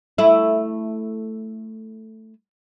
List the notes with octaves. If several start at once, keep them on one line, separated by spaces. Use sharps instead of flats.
A3 E4